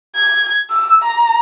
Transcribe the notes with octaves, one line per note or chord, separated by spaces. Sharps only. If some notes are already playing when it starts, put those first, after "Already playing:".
G#6
E6
A#5